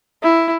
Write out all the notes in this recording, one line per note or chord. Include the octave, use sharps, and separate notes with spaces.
E4